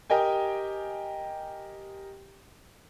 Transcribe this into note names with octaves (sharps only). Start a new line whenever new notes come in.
G4 A#4 D#5 G5 G#5